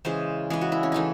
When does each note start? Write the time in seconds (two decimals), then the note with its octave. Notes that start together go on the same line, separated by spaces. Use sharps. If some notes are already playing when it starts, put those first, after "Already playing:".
0.05 C#3 E3 G#3 C5
0.50 C#3 E3 G#3 G#4
0.61 F#4
0.72 E4
0.83 C#4
0.92 C#3 E3 A3 D#4